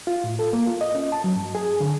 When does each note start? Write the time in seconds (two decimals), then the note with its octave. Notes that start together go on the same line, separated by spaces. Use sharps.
0.07 F4
0.24 A2
0.39 A4
0.53 A#3
0.67 F4
0.81 D#5
0.95 C#4
1.12 A5
1.24 F#3
1.36 G2
1.55 G#4
1.80 D3